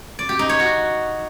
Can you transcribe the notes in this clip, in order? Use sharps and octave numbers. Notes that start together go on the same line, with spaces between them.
D5
G4
D#4
C#5
F#4